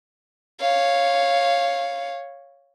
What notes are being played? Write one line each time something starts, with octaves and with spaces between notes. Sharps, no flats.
C#5 F5